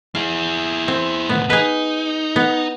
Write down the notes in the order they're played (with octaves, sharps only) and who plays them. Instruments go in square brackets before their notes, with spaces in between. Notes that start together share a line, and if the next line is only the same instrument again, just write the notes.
[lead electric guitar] E4 G#4 [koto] F5
[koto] C4
[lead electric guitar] D#2 A2 [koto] B3
[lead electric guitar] D#4 [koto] G#4 B4
[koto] B3